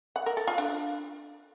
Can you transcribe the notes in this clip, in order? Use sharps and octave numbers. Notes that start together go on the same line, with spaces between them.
F#5
A#4
A4
F4
D4